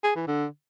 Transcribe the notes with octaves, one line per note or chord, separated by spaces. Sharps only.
G#4
E3
D3